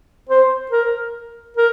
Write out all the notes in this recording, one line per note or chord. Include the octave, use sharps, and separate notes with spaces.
C5
A#4
A#4